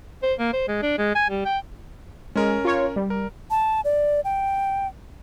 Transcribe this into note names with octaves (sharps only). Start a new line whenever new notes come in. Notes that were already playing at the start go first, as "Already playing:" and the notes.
C5
A#3
C5
G#3
D4
G#3
G#5
G3
G5
G#3 C#4 A#4
F4 C#5
G3
A#4
A5
D5
G5